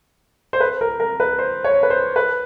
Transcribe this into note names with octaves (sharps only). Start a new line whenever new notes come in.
C5
B4
A#4
A#4
B4
C5
C#5
B4
C5
B4